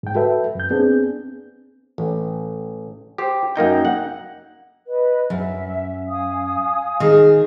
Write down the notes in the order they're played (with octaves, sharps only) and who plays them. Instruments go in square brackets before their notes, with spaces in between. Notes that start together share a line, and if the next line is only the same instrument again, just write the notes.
[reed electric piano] G#2 G5
F#4 A4 B4 E5
F#2 G6
B3 C4 D4 G#4
[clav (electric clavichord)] A1
G4 C5
F#2 A#3 D#4 G5
F#5
[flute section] B4 D#5
[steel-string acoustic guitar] F#2 [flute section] E5
[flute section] F5 G#5 D#6
[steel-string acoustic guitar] D#3 G#4